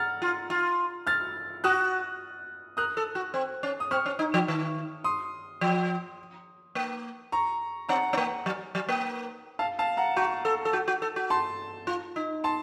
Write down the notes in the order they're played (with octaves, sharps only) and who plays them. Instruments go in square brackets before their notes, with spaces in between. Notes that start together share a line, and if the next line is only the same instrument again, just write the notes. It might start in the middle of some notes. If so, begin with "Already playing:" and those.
Already playing: [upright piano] F#5 A#5 F6 A6
[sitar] F4
F4
[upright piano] F6 A6
[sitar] F#4 [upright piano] D#6 F#6
[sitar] A#4 [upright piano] D#6 F#6
[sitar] A4
F#4
C4
C#4
[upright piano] D#6
[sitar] C4 [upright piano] C#6 F6
[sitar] C#4
D#4
F3
D#3
[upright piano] C6 D#6
[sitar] F3
A#3
[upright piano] A#5 C#6
[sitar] C4 [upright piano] F#5 A#5
[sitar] C4
A#3
F#3
F#3
A#3
[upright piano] F5 A5
F5 A5
F#5 A#5
[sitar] F#4 [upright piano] A#5 C#6
[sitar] A4
A4
F#4
F#4
A4
F#4
[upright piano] A5 C6
[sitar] F4
D#4
[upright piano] A5 C6